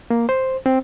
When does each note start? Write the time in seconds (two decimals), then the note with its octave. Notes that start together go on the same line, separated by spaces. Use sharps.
0.10 A#3
0.29 C5
0.66 C4